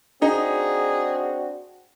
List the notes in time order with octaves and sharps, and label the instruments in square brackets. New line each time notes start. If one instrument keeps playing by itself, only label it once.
[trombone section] C4 D4 F#4 [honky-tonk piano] D#4 [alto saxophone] G#4